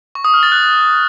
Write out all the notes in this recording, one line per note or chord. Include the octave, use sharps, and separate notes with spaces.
C#6
D#6
F6
A6
F#6